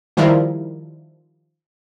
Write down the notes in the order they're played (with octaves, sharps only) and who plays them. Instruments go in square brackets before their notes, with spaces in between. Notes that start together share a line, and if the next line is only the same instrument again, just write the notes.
[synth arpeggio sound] D#3 F3 G3 E4 F4 A#4